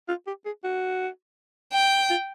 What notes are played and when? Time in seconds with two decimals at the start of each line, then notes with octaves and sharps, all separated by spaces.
0.09 F4
0.27 G4
0.46 G#4
0.64 F#4
1.73 G5
2.10 F4